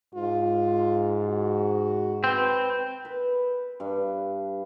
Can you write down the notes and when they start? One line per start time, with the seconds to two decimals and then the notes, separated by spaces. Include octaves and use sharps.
0.15 G#2 F4
1.27 F#4
2.24 C4 B4
3.05 B4
3.80 G2